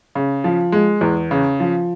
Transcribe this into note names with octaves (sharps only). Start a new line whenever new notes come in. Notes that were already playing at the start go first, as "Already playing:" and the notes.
C#3
F3
G#3
E2
C#3
F3